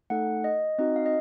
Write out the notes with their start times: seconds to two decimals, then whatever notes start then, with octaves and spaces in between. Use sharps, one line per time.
0.10 A3 D#4 A4 F#5
0.44 D#5
0.78 C4 D#4 F#4 D#5
0.96 F5
1.06 D#5